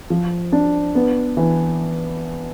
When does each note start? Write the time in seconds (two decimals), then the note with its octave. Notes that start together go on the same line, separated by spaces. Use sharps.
0.10 F3
0.52 D4
0.95 B3
1.37 E3